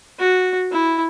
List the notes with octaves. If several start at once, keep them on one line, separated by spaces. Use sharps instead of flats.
F#4
E4